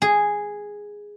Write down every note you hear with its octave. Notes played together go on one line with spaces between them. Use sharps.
G#4